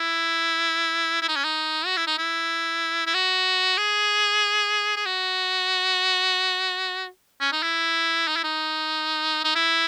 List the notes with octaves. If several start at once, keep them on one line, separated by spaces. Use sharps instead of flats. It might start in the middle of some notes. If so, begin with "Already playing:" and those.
Already playing: E4
E4
D#4
C#4
D#4
F#4
E4
D#4
E4
E4
F#4
G#4
G#4
F#4
C#4
D#4
E4
D#4
E4
D#4
D#4
E4